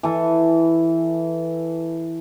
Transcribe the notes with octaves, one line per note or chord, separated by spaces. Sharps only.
E3 A4